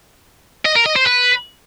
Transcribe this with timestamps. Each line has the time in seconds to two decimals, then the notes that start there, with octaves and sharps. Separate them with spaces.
0.65 D#5
0.75 A#4
0.86 D#5
0.96 C5
1.06 B4